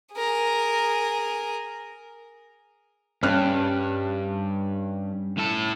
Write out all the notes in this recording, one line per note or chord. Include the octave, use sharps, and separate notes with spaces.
G#4 A#4
G2 C#4 F6 F#6
A2 A4